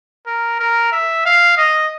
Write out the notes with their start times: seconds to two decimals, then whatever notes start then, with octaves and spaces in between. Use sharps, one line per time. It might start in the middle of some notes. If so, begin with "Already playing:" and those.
0.27 A#4
0.59 A#4
0.92 E5
1.25 F5
1.57 D#5